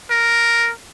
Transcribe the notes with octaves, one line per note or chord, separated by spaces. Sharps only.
A#4